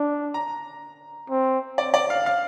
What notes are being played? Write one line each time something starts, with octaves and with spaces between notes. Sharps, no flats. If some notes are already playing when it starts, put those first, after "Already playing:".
Already playing: D4
A#5
C4
D5
D5
F5
F5